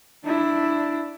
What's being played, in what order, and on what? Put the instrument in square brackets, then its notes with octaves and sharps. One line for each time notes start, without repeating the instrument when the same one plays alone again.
[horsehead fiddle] D4 E4